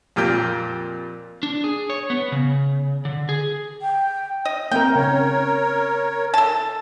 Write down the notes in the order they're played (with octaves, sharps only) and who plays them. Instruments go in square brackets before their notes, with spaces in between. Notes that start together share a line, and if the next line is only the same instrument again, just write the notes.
[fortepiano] F2 A#2 A#3 G4 G5
[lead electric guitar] D4
G#4
C#5
B3
C#3
D3
G#4
[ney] G5
[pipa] D#5
[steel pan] A#3 C4 A#4 [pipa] G5
[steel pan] C#3 C#4 [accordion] A#4 C#5
[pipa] A4 A5